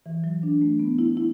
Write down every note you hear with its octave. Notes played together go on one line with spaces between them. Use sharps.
E3
F#3
D4
A3
B3
E4
E4